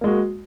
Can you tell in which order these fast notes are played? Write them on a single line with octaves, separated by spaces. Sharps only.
A#3 G#3 F#4